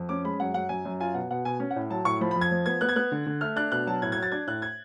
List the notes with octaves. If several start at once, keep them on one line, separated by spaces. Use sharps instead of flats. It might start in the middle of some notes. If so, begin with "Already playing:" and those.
Already playing: F2
C#4 D6
G#3 B5
F#2 F#5
F#2 F#5
F#2 G#5
F#2
F4 G#5
B2 F#5
B2 F#5
B2 G#5
C#4
F#5
A2
F#3 A5
A2 C#6
F3 B5
B5
F2
G#6
F3
B3 G#6
B3 F#6
G#6
B3 F#6
D3
D3
A3 F6
D4 F#6
B2 F#6
F#3 A5
A2 G#6
G#6
F#3
A6
D4 G#6
A2 F#6
G#6